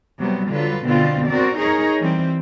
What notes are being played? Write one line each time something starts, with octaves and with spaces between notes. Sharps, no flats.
C3 F#3 G3 B3
D3 F#3 F4 B4
B2 D3 B3 C4 F4
C4 F#4 A#4 D5
D#4 G#4 A#4 C#5
E3 G3 C4